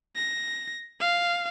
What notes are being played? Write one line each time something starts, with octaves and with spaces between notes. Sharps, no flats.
A#6
F5